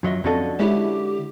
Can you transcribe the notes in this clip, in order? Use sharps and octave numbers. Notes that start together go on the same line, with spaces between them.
F#2 F#3 F4 D#5 E5
F2 D3 C#4 F4 F#4 A4 D#5
G#3 C#4 E4 G4 B4 C#5